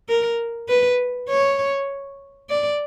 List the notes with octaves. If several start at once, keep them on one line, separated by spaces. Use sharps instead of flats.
A#4
B4
C#5
D5